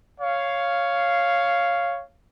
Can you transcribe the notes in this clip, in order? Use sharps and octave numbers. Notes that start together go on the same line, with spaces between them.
C#5 F5